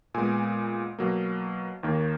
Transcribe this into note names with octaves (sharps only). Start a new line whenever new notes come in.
A#2 G#3 B3 G#5
B2 F#3 A#3
D#2 D#3 A#3